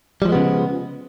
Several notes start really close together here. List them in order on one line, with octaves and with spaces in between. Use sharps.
G3 F3 G#3 B3 C#3